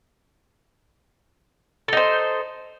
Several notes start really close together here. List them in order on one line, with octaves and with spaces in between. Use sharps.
A4 D#4 C5